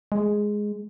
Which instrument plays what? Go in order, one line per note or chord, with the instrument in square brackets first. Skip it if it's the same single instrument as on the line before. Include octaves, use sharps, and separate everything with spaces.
[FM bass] G#3